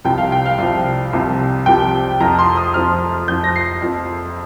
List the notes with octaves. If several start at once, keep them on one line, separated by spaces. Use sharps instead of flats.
C2 C3 F3 G5
F5
G5
F5
C2 C3 F3
C2 C3 F3
C2 C3 F3 G5
F2 F3 A#5
C6
D#6
F2 F3 F6
F2 F3 G6
A#6
C7
F2 F3